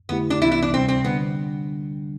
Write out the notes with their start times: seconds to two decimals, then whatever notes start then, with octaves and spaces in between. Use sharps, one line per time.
0.09 F2 D3 A3 B3 E4 G4
0.30 D4
0.41 C2 C3 E3 B3 E4
0.52 E4
0.62 D4
0.73 D2 C3 G3 C4
0.89 C4
1.04 D3 G3 B3 D4